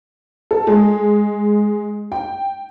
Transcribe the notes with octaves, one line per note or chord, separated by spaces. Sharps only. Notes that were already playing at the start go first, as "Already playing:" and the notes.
A4
G#3
G5